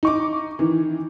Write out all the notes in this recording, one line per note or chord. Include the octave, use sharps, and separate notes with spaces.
D#4 C#6 D6
D#3 E3